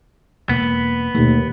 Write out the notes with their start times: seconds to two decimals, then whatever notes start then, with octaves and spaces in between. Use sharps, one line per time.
0.49 E1 A#3 B3
1.15 D#2 B2 A3